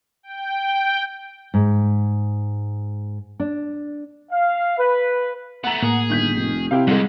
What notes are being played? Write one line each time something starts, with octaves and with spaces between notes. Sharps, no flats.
G5
G#2
D4
F5
B4
A3 B3 F#5 A#5
A2 A#3 G#4
G1 D#3 G6 B6
F1
C3 E4 G4 F5
C2 F2 G3 G#3